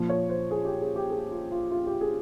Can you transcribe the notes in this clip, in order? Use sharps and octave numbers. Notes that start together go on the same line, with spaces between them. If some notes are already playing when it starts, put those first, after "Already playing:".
Already playing: A#2 F3
C#5
C5
G#4
G4
G#4
G4
G#4
F4
F4
F4
G4
G#4